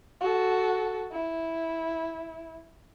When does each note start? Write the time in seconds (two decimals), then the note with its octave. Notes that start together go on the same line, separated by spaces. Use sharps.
0.21 F#4 A4
1.12 E4